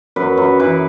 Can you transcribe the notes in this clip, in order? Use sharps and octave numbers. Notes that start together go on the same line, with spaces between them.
F#2 B4
F#2
E3 B4